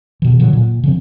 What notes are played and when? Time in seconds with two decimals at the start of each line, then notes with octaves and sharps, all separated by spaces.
0.22 B2 E3
0.40 A#2 D3 F3 F#3
0.53 A#2
0.84 C#3 F3 C4